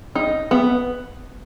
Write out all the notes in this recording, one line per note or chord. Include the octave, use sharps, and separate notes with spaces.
D#4
B3